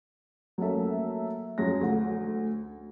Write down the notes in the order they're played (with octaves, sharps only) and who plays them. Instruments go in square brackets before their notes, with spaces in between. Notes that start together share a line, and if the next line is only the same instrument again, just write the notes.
[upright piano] F#3 A3 A#3 C#4 A4 E5
F2 F#3 G#3 C#4 A#6
D2 F#5